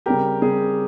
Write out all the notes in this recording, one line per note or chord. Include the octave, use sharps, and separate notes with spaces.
C#3 G3 C4 G4 A#4
C#3 G3 C4 G#4